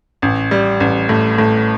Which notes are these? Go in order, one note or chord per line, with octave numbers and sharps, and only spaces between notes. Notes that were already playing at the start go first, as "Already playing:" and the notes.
A1
G3
A1
A2
A2